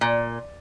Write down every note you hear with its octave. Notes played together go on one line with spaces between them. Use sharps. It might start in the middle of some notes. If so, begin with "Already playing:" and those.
A#2